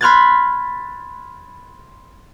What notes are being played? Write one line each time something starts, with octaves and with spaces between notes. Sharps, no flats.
B5 C6 F6 F#6 G#6 A6